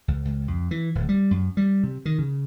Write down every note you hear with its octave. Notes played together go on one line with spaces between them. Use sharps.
C#2
C#2
F2
E3
D1
G3
F#2
G3
C3
D#3
C#3